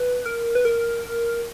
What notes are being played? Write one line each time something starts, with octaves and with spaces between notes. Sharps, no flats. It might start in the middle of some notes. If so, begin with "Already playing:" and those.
Already playing: B4
A#4
B4
A#4